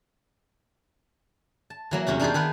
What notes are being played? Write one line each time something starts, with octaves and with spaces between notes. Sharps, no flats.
A5
E3 F#3 A#3
E2 C3 C#4 F#4
D4 D#4 F4 G4 G#4
D#3 G#4 B4 F#5